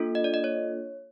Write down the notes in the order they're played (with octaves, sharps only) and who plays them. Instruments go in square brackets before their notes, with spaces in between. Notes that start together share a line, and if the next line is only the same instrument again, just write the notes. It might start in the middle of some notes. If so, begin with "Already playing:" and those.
Already playing: [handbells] A#3 D4 F4 A4
D#5
D5
D#5
C#5